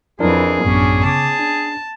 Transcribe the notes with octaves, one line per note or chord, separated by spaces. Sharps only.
F2 E3 D4 E4 G#4 A#4
A1 F#2 A2 B3 C#4 D4
C#3 G#4 A5 D6
D4